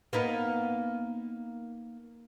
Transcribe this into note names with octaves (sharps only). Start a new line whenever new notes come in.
A#3 B3 D#4